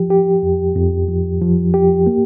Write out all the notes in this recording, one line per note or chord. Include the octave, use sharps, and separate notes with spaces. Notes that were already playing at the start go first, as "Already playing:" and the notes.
Already playing: F3 G4
G4
F2
F2
F3
F3
G4
A#3